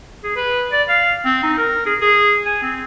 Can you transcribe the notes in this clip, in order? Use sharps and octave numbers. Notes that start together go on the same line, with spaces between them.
G#4
B4
D5
F5
C4
D#4
A#4
G#4
G#4
G#5
C4